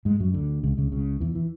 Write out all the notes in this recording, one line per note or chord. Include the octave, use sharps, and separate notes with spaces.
G#2 G#3
F#2 F#3
D2 D3
C#2 C#3
C#2 C#3
C#2 C#3
E2 E3
E3